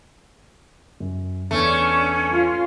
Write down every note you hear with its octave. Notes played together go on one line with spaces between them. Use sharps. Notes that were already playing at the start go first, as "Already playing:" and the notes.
F#2
E2 A3 C#4 D4
F4